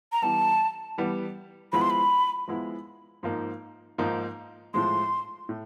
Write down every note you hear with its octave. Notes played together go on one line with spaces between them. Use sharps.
A#5
E3 G3 B3 A5
E3 G3 B3
F3 G#3 B3 E4 B5
C6
B5
F3 G#3 B3 E4
G#2 F3 A#3 D#4
G#2 F3 A#3 D#4
A2 F3 G#3 C6
A2